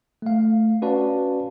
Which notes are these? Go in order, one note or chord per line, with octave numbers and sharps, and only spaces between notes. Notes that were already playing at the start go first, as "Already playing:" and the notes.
A3 F5
C#4 F#4 B4 D5 F5 A5